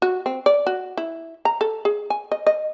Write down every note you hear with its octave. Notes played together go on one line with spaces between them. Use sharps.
F#4
C4
D5
F#4
E4
A#5
A4
G#4
G#5
D#5
D#5